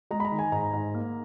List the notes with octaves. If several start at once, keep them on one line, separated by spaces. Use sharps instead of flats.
G#3 A#5
B5
A#5
D#3
G#5
G#2 A#5
G#2
A#3